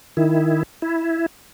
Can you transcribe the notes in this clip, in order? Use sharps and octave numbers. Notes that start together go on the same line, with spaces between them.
D#3 E4
E4